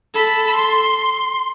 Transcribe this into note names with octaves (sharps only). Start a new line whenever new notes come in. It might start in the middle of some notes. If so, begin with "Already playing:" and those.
A4 B5
C6